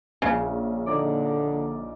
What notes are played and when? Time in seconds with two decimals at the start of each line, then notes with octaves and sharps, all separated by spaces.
0.22 A#1 C#3
0.86 D3 D#4 D5 D6